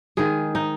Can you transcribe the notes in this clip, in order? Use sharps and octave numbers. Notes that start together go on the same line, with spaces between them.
D#3 G#3 G#4
D#4